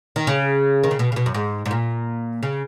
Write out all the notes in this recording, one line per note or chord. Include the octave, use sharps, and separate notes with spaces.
D#3
C#3
D#3
C#3
B2
C#3
B2
F#2
G#2
G#2
A#2
C#3